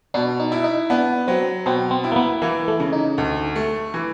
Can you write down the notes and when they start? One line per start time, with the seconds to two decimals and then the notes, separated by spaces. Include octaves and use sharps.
0.14 B2 D4
0.40 D#4
0.52 E4
0.64 D#4
0.90 B3 D4
1.28 F#3 C4
1.66 B2 C4
1.91 C4
2.04 E4
2.12 A#3
2.16 B3
2.42 E3 A#3
2.68 A3
2.80 C#3
2.93 D#4
3.18 D2
3.56 A3
3.94 E3